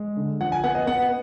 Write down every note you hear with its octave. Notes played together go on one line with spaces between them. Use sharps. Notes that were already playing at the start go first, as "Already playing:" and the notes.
Already playing: G#3
D3
F3 F#5
G#5
B3 F#5
D#5
B3 F#5